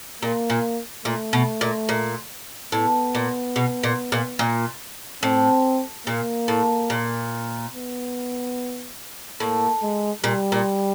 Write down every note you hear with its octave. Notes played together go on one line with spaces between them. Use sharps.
A#2 A#3
A#2
A#2 A3
B2
A#2
A#2
A2 B3
A#2
B2
A#2
A#2
A#2
A2 C4
A#2 A#3
A2
A#2
B3
A2 A#3
G#3
A#2 G3
A#2